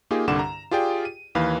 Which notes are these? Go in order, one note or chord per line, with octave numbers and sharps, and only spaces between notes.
A#3 D#4 F4 G4 G#4
C2 G2 D3 F#5 D6 E7
A#5
F4 G4 G#4 D5 G5
D#7
D#2 E3 B4 F5